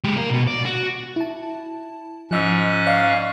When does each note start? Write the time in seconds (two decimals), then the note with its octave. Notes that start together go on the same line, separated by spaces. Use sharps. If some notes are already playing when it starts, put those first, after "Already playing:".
0.04 G#3 G4
0.17 A#3 A#4
0.30 B2 F#4
0.48 D5
0.65 F#4
1.16 E4 A5
2.31 G#2 F3 C#4 D#5 E6 F#6
2.86 D5 D#5 F5 C#6